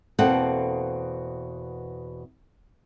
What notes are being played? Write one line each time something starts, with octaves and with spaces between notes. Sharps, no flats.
E2 B2 A#3 C4 A4 F#5